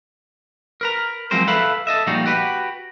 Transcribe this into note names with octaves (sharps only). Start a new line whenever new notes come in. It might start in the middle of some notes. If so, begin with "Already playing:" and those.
A#4 B4 A#5
F3 F#3 G#3 C4 A#4 C5
A4 B4 E5 F5 B5
A4 D#5 E5
A#2 F3 G3 D#4 F#4
F#4 G4 B4